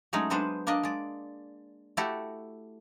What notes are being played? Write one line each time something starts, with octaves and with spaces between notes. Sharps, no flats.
F#3 G#3 A3 C#4 D#4
F#3 G#3 B3 D4 B4 C5
A#3 D4 D5 D#5
G#3 D5
A3 E4 F#4 G4 A4